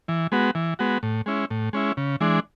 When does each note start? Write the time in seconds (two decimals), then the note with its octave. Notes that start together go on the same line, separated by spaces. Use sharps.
0.08 E3
0.32 G#3 B3 F#4
0.55 E3
0.79 G#3 B3 F#4
1.03 A2
1.26 G#3 C#4 E4
1.50 A2
1.73 G#3 C#4 E4
1.97 C#3
2.20 E3 G#3 D4